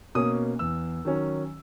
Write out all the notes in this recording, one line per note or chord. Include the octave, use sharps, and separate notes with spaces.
B2 A#3 C#4 D#6
E2 E6
D#3 F#3 C#4